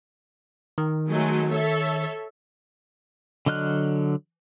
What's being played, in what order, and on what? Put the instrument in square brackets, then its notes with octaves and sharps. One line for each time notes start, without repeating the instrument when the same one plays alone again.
[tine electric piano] D#3
[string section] F#3 G#3 A3
A4 C#5 E5
[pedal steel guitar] D3 F#3 D#5 F6 F#6